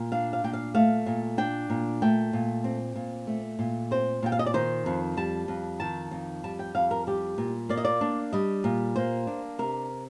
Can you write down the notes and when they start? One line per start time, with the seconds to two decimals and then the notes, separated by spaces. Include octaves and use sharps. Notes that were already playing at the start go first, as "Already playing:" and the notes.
Already playing: A#2
0.12 D4 F5
0.33 F5
0.44 A#2 G5
0.53 F5
0.74 A3 F5
1.06 A#2
1.38 D4 G5
1.70 A#2
2.02 A3 G5
2.33 A#2
2.64 C4
2.95 A#2
3.27 A3
3.59 A#2
3.91 C4 C5
4.22 A#2 G5
4.32 F5
4.39 D#5
4.46 D5
4.54 D#3 C5
4.86 F2
5.17 G3 A5
5.48 F2
5.80 D#3 A5
6.11 F2
6.44 G3 A5
6.59 G5
6.75 F2 F5
6.91 A#4
7.07 G3 G4
7.38 A#2
7.69 A#3 D5
7.77 D#5
7.85 D5
8.01 D4
8.33 G3 D#5
8.64 A#2
8.96 A#3 C5
9.27 D4
9.59 C3 A#4